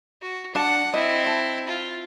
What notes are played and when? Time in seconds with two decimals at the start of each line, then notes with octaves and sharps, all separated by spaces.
0.22 F#4
0.55 D4 F#5 A5
0.94 C4 E4 D#5
1.26 A5
1.68 F4